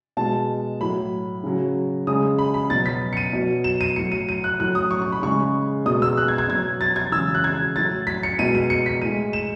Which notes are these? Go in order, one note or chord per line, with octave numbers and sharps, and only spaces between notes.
B2 G#3 A5
A2 F#3 B5
C#3 F#3
C#3 G#3 D#6
B5
B5
B2 F#3 A6
B6
C#7
D#7
B2 F#3
E7
D#7
A2 F#3 C#7
D#7
D#7
F#6
A2 F#3 F#6
D#6
C#6
C#6
B5
C#3 G#3 C#6
B2 G#3 D#6
E6
F#6
G#6
G#6
B2 F#3 G#6
A6
G#6
C#3 E3 G#3 E6
F#6
G#6
A2 F#3 A6
B6
C#7
B2 G#3 D#7
D#7
C#7
B6
A2 G#3 D#7
E7